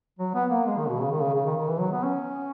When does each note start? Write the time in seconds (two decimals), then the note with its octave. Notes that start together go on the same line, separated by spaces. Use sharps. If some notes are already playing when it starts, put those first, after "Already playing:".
0.19 F#3
0.34 B3
0.50 A#3
0.66 G#3
0.77 D#3
0.89 B2
1.00 C#3
1.11 D#3
1.22 C#3
1.35 C#3
1.46 D#3
1.57 D#3
1.68 E3
1.80 F#3
1.92 B3
2.03 C#4